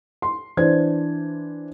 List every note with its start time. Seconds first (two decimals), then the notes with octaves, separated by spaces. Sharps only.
0.22 C6
0.57 E3 D4 C5 G#6